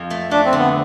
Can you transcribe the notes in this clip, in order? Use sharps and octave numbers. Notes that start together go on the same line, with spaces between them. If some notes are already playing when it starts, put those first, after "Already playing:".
Already playing: F2
A3
A3 D4
C4
D3
B3